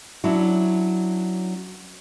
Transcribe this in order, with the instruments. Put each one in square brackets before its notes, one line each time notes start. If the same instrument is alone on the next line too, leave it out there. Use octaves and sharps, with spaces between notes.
[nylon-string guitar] F#3 C#4 D4 E4